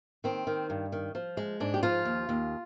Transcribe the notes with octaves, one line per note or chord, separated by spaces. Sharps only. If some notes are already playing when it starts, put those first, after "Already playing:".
D#3 C4
D#3
G2
D#3
F3
G#3
G#2 D4
G4
F3 F4
D#2
D#2